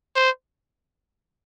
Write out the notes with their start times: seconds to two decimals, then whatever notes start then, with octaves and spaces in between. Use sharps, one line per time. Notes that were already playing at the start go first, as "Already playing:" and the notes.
0.16 C5